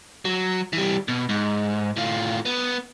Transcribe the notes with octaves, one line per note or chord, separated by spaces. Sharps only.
F#3
E3 G3
B2
G#2
A2 F4
B3